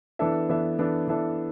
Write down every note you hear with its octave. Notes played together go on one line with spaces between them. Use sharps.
E3 B3 D4 A4 E5
E3 B3 D4 A4 E5
E3 B3 D4 A4 E5
E3 B3 D4 A4 E5